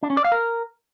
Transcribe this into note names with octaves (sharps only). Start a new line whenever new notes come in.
D4
C#4
D5
F5
A#4